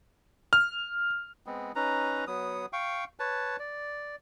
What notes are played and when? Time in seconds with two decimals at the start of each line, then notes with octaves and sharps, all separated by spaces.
0.53 F6
1.46 G#3 B3 C4
1.76 C#4 D#4 B4 A#5
2.27 F#3 B3 D#6
2.73 F5 G5 C#6
3.20 B4 C#5 A5
3.59 D5